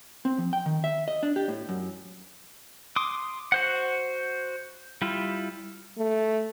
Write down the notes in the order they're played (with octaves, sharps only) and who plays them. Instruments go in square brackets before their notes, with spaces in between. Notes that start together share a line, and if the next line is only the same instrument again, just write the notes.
[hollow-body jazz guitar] C4
F3
G5
D#3
E5
D#5
D4
G4
A2
F#2
[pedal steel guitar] C6 D6 D#6
F#4 C5 F#5
G3 E4 F4
[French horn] A3